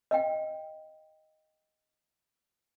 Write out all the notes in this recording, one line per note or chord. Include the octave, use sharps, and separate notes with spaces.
D#5 F5 G5